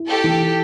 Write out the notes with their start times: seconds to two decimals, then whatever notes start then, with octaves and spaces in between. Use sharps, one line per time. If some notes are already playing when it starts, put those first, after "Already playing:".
Already playing: E4
0.09 G4 A4
0.24 E3